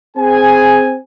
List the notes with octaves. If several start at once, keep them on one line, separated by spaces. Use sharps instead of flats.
C4 G#4 G#5